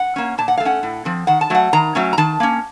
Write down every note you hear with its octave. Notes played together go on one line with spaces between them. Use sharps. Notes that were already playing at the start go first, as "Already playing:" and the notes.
Already playing: F#5
A#3 C#4
A#2 A5
F#5
A3 F5
C#4 F#5
A2
F3 C4
D#3 F#5
A5
F#3 A3 F#5
D#3 A#5
F#3 A3 C#4
A#5
D#3 A5
A#3 C#4